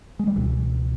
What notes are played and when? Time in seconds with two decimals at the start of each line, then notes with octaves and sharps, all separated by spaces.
0.19 G#3
0.27 G3
0.36 C#2 B2 E3